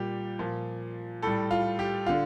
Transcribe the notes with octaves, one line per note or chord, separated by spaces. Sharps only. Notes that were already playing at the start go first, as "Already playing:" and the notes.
Already playing: A#2 G3 G4
A#2 F3
A2 G3 A4
F4
G4
D3 F4